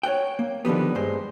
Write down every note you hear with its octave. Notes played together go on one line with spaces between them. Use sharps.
C#5 D5 F#5 G5
A#3
D3 D#3 F3 G3 B3
G2 G#3 C5